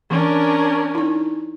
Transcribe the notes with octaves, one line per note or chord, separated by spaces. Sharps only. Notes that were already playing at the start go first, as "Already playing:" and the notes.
E3 C#4 D4 A#4
D#4 E4